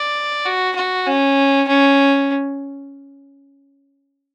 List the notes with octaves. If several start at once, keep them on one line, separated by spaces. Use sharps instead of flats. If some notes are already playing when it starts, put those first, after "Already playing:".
Already playing: D5
F#4
F#4
C#4
C#4